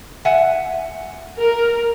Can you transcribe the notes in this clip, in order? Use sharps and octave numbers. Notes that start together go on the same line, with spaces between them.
E5 F#5 G#5
A#4